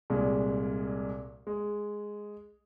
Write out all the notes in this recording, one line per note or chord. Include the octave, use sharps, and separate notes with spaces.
C2 A#2 G#3
G#3